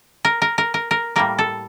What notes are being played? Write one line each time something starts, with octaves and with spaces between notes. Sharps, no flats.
A#4
A#4
A#4
A#4
A#4
A2 G3 A#3 A#4
A4